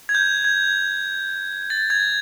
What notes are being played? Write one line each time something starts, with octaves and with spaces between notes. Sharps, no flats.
G#6
G6
G#6
A6
G#6